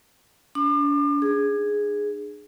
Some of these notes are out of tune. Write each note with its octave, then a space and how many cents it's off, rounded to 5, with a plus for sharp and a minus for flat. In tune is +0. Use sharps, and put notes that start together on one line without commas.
D4 -40 D6 +40
D4 +35 G#4 +0